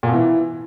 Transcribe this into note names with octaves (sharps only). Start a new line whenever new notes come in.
A#2
B2
E3